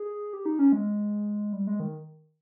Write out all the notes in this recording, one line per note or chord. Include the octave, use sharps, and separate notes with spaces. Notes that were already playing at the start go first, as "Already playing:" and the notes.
Already playing: G#4
G4
D#4
C#4
G#3
G3
G#3
D#3